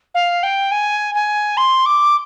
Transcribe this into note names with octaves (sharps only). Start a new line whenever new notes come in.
F5
G5
G#5
G#5
C6
D6